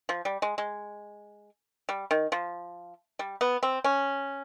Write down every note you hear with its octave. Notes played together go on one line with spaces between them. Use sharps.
F3
G3
G#3
G#3
G3
D#3
F3
G3
B3
C4
C#4